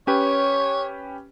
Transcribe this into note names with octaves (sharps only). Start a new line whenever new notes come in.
C#4 G4 B4 C#5